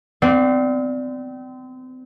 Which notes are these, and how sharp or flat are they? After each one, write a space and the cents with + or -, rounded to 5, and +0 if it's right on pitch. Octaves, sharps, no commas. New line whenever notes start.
C4 -35 D5 +0 F5 +25